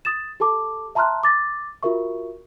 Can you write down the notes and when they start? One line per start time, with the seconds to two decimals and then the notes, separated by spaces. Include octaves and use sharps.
0.05 D#6 A6 E7
0.40 G4 A4 A5 D6
0.95 E5 A5 A#5 C6 F6 F#6
1.23 D6 A6 A#6
1.83 F4 F#4 A#4 E5 C#6